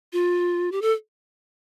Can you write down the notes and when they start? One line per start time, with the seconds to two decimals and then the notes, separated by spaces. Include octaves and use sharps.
0.13 F4
0.72 G4
0.82 A4